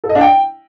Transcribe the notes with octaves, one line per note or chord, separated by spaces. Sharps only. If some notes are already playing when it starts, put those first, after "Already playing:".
A4
D#5
D4
G5